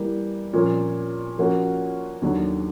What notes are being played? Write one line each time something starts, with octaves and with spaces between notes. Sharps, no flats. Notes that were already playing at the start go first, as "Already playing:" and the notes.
Already playing: E3 G3 A#3
A#2 F3 A#3 C#4
F3 A#3 C#4 F#4
D#2 D3 F#3